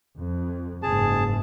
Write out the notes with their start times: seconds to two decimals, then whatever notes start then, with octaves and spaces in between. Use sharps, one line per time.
0.19 F2
0.83 F#1 G#2 G#4 A5